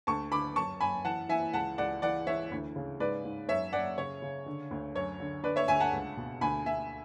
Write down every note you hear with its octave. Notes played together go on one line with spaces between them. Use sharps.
D2 A5 C#6
D3 B5 D6
F#2 A5 C#6
F#2 G#5 B5
E3 F#5 A5
E3 E5 G#5
C#2 F#5 A5
C#2 D5 F#5
E3 D5 F#5
E3 C#5 E5
D2
C#3
G#2 B4 D5
G#2
F#2 C#5 E5
F#2 D5 F#5
C#3 C#5
C#3
D3
D2
F#2 C#5
D3
D3 B4 D5
C#5 E5
D2 E5 G#5
F#5 A5
C#2
B2
D2 G#5 B5
D2 E5 G#5